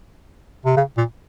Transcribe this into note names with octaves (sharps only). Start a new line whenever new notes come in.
C3
C#3
A#2